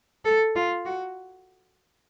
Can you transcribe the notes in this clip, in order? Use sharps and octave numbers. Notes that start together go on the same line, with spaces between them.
A4
F4
F#4